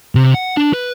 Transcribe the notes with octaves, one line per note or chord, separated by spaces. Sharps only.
C3
F#5
D4
B4